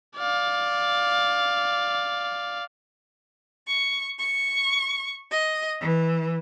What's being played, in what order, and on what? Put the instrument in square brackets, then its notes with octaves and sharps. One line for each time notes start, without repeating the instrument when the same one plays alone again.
[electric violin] D5 F5
[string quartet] C#6
C#6
D#5
E3